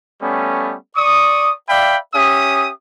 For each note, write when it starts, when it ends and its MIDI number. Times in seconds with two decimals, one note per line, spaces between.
0.22 0.75 55
0.22 0.75 57
0.22 0.75 59
0.22 0.75 61
0.96 1.52 74
0.96 1.52 85
0.96 1.52 87
1.69 1.99 74
1.69 1.99 76
1.69 1.99 77
1.69 1.99 79
1.69 1.99 83
2.14 2.70 61
2.14 2.70 67
2.14 2.70 76
2.14 2.70 87